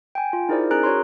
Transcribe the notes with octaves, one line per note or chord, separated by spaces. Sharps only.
G5 G#5
F4
D#4 E4 G#4 A#4 C5 D5
C#4 G#4 A#4 A#5 F#6 D7
F#4 C#5 A#5 C6